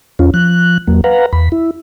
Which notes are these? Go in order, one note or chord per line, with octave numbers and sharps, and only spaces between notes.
E2 C#4 F4
F3 F#6
E2 F#3 A#3
B4 F5 F#5 A#5
E2 B5
E4